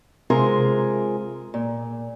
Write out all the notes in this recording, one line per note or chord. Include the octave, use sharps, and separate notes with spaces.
C3 G#3 F4 G#4 A#4
A#2